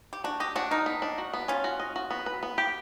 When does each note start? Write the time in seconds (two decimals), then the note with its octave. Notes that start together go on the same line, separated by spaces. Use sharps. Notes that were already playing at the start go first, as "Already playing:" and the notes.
0.13 G4
0.24 D4 F#4
0.40 G4 D#5
0.56 D4 F#4
0.71 D#4 A#4
0.86 B3
1.02 D4
1.18 F#4
1.34 B3
1.48 C#4 F4
1.64 F#4
1.80 D#5
1.96 F#4
2.11 B3
2.26 B4
2.43 B3
2.58 G4